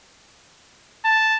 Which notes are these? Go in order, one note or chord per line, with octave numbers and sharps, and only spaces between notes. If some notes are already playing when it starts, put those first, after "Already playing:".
A5